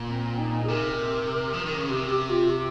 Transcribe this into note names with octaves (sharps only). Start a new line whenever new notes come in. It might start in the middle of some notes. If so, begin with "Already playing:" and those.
Already playing: A#2
C4
D#4
G#4
C3 A#4
F3
D#3
C#3
C3 G4
G4
F4
G4